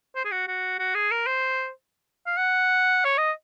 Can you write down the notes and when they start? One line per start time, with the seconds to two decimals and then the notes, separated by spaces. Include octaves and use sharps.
0.16 C5
0.25 G#4
0.32 F#4
0.48 F#4
0.79 F#4
0.95 G#4
1.12 A#4
1.27 C5
2.27 F5
2.37 F#5
3.05 C#5
3.18 D#5